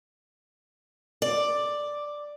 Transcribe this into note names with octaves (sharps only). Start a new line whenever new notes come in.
D5